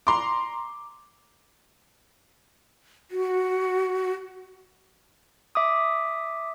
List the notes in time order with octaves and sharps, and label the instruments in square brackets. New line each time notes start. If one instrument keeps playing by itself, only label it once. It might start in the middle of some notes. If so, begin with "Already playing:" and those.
[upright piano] A#5 C6 D6
[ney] F#4
[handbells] E5 D6 D#6